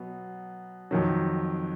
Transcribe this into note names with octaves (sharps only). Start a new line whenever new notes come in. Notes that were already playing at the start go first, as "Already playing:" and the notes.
Already playing: B2 F#3 B3
F2 D#3 F#3